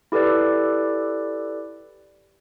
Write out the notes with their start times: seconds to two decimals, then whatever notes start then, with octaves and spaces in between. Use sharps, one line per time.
0.12 E4 G4 A4 B4 D5